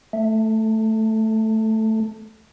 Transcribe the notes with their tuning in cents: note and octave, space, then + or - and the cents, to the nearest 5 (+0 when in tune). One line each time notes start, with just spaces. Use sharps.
A3 +0